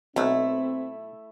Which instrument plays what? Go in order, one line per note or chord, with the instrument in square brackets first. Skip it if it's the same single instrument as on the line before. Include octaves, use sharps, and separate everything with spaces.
[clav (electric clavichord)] B1 [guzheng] A3 E4 [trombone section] C4